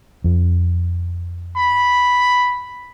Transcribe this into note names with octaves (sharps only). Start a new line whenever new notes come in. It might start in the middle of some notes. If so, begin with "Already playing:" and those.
F2
B5